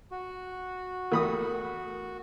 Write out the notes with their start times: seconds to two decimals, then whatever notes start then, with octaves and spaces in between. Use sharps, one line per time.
0.12 F#4
1.12 E2 A3 A#4 B5 D#6